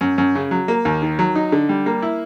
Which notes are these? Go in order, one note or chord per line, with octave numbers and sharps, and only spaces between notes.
F#2
F#2
C#3
F#3
A#3
D#2
D#3
F#3
D#4
D3
G3
A#3
E4